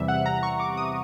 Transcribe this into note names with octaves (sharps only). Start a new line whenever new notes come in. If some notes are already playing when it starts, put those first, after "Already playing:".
Already playing: E2 C3 E3 G3 E5
F#5
A#5
C#6
D6
D#6